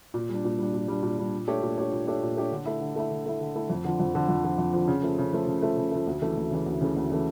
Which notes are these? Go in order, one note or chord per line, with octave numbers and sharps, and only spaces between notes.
A#2
G3 D4
A#2
G3 D4
A#2
G3 D4
A#2
G3 D4
A#2
A3 D4 G4 C#5
A#2
A3 D4 G4 C#5
A#2
A3 D4 G4 C#5
A#2
A3 D4 G4 C#5
D3
A3 E4
D3
A3 E4
D3
A3 E4
D3
A3 E4
F2
D3 F3
F2
D3 F3
F2
D3 F3
F2
D3 F3
C#3
F3 A3
C#3
F3 A3
C#3
F3 A3
C#3
F3 A3
D2
C#3 E3 A3
D2
C#3 E3 A3
D2
C#3 E3 A3
D2
C#3 E3 A3